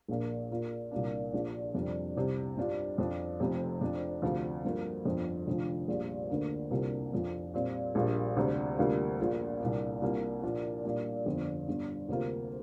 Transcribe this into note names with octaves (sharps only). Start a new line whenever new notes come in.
A#1 A#2 A#3 D4
A#2 A#3 F4
C2 A#2 A#3 D4
A#1 A#2 F3 D4
F2 C3 G3 D4
C2 C3 G3
G2 G3 D4 F4
F2 F3 D4
F1 F2 C3
F2 F3 D4
D2 C3 F3 D4 F4
G2 F3 A#3
G1 F2 D3 F3
F1 F2 D3 F3
A#1 A#2 G3
D2 D3 A#3
C2 C3 A#3 D4 F4
F2 F3 D4
A#2 G3 C4
A#1 A#2 G3 A#3 D4
D2 C3 G3 D4
D2 C3 G3 A#3 F4
A#1 A#2 A#3 F4
C2 A#2 A#3 D4
C2 C3 A#3 D4 F4
A#2 F3 A#3 D4 F4
A#2 G3 A#3 D4
G1 F2 D3
G1 G2 D3
D2 C3 A#3 F4